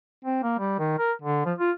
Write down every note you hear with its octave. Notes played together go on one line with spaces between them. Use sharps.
C4
A#3
G3
D#3
A#4
D3
F3
F4